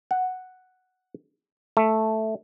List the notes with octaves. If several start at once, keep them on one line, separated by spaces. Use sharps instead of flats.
F#5
A3